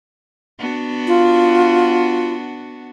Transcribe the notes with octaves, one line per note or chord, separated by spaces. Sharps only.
B3 D4 F#4
F4